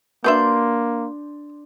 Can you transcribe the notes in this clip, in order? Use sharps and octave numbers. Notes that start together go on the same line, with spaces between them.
A#3 D4 F#4 B4 E5 C6 G6